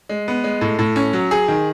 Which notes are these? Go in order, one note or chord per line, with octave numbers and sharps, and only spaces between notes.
G#3
B3
G#3
A2
A2
C#4
F#3
G#4
D#3